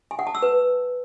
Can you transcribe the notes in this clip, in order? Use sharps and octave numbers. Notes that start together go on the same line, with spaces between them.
G#5
F#5
A5
E6
B4